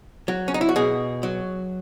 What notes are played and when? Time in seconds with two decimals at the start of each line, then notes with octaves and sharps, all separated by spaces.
0.28 F#3
0.48 C#4
0.54 D#4
0.61 E4
0.69 F#4
0.76 B2 G#4
1.23 F#3